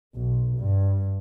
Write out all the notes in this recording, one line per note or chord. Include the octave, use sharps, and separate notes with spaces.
B1
G2